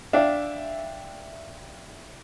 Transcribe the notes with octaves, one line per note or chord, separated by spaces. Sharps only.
D4 E5 F5 G5